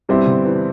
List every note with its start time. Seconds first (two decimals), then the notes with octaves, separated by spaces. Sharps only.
0.09 G2 B2 G3 C4 E4
0.27 B2 D3
0.45 C3 E3